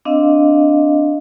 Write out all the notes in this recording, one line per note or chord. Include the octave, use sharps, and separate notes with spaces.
C4 D4 D#5 F5